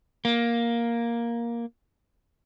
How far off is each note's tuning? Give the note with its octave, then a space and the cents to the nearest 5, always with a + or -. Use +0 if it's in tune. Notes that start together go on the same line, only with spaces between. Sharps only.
A#3 +5